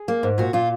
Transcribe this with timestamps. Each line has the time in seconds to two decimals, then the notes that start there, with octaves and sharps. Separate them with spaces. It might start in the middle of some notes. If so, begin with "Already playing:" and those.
Already playing: G#4
0.08 A#3
0.23 G#2
0.38 A#2 F#4
0.53 A#2 F4